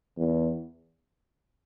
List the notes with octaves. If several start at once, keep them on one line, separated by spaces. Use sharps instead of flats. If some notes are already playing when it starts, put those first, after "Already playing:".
E2